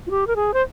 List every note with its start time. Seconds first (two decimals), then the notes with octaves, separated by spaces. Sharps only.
0.07 F4
0.11 G4
0.27 A#4
0.36 G#4
0.54 C5